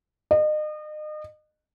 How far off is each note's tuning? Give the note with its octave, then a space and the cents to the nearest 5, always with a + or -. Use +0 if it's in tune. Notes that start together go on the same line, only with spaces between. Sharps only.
D#5 -35